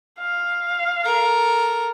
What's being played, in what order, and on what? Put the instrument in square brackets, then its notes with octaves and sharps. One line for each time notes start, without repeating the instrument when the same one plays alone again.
[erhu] F5
[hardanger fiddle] A4 A#4